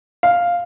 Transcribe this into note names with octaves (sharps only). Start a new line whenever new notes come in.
F5